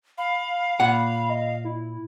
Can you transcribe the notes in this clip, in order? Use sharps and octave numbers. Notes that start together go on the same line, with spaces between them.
F5 B5
A#2 F#5
D#5
E4